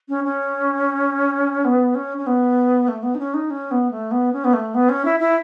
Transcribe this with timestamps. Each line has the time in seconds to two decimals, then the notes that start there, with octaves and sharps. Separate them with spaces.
0.09 C#4
0.24 C#4
1.65 B3
1.95 C#4
2.18 C#4
2.27 B3
2.88 A3
3.03 B3
3.15 D#4
3.19 C#4
3.34 D#4
3.50 C#4
3.71 B3
3.91 A3
4.11 B3
4.33 C#4
4.44 B3
4.53 A3
4.75 B3
4.89 C#4
5.05 E4
5.20 E4